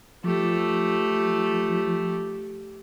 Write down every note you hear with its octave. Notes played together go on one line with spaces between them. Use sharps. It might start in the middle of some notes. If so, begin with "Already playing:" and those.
F3 A3 G4